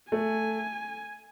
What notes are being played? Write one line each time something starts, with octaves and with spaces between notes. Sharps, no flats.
A3 G#5